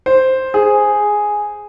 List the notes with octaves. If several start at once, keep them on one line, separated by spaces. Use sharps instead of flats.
C5
G#4